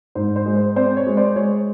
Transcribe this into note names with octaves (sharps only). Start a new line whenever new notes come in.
G#2 C5
C5
G#3
C5
C4 C5 D5
C#5
G#3
C5 D5
G#3 C#5